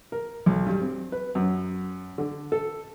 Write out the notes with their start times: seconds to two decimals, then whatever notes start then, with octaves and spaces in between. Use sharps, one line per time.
0.12 A#4
0.46 B1
0.66 G2
0.81 C4
1.12 B4
1.35 F#2
2.18 D3
2.52 A4